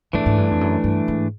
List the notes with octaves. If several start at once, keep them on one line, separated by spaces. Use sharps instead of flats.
G#2 E3 A3 D4
G#2
G2
F2
F#2
G2
G#2